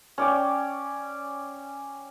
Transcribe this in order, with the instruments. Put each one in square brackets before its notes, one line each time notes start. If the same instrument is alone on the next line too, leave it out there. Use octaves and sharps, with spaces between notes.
[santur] C#4 D5 G5